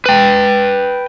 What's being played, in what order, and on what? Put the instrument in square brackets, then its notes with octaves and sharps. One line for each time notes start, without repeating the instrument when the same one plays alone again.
[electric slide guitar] B4 G5